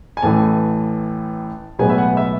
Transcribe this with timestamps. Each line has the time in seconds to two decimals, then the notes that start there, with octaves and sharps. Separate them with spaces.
0.17 G#5
0.23 A1 A2 E3 A3 A5
1.79 B1 A2 G#3 B3 G#5
1.90 E5
1.98 F#5
2.17 E5